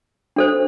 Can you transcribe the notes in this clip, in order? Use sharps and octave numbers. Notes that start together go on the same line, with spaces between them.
D4 A4 C5